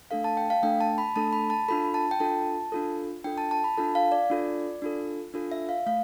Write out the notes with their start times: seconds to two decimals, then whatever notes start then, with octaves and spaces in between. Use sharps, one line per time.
0.11 A3 D4 A4 F5
0.24 A5
0.37 G5
0.50 F5
0.63 A3 D4 A4 G5
0.81 A5
0.98 B5
1.16 A3 D4 A4 A5
1.33 B5
1.50 A5
1.68 D4 F4 A4 B5
1.94 A5
2.11 G5
2.20 D4 F4 A4 A5
2.72 D4 F4 A4
3.24 D4 F4 A4 G5
3.38 A5
3.51 A5
3.64 B5
3.77 D4 F4 A4 A5
3.95 F5
4.12 D5
4.30 D4 F4 A4
4.82 D4 F4 A4
5.34 D4 F4 A4
5.52 E5
5.69 F5
5.86 A3 F5